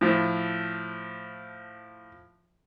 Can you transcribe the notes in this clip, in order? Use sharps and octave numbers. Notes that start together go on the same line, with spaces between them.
A2 F3